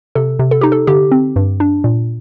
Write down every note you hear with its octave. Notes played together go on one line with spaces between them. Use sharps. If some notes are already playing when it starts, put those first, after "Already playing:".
C3 A4
C3
A4
D#4 G4
A4
D3 G4
C4
G2
D4
A#2